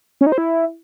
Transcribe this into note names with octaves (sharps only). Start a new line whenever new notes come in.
C#4
D#4
C5
E4